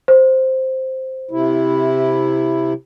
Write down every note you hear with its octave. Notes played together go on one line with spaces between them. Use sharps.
C5
C3 E4